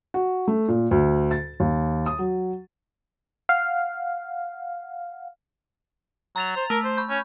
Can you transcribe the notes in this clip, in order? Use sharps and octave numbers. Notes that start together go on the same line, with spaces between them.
F#4
A3
A#2
D2
A6
D#2
D#6
F#3
F5 F#5
F#3 A#5 A6 F7
C5
A3 A#4
C5
B5 C#6 G6
C#4